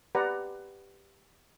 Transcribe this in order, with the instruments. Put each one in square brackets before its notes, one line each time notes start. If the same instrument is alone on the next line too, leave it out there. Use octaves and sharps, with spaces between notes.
[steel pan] G4 B4 D5 F#5 A#5